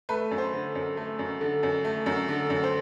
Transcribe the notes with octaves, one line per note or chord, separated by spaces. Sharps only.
A3 B4
F#2
C5
D3
F#2
A3
F#2
D3
F#2
A3
F#2
D3
F#2
C5